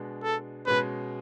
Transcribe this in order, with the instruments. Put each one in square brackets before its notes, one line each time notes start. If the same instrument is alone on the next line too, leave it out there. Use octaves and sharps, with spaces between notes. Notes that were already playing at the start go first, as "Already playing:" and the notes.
Already playing: [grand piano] B2 G#3 D4
[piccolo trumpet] A4
[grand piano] B2 G#3 C#4 [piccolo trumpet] B4